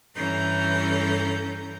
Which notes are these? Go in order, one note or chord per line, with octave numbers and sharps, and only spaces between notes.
G2 E3 C#4 A4 A#5 G6